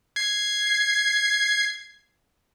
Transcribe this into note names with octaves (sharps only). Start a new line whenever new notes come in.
G#6 C7